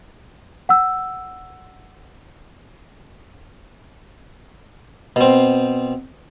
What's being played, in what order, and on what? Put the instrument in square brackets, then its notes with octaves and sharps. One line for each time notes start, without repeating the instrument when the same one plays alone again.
[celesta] F#5 E6
[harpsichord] B2 C4